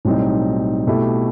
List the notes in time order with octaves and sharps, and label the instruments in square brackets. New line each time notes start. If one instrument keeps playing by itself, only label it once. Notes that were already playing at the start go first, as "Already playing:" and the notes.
[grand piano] B1 A2 G3 C4 D#4
B2 A3 E4 G4